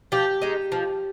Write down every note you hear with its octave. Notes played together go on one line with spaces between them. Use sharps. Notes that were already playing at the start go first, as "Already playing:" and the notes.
F3 G4
G#3 D#4
F3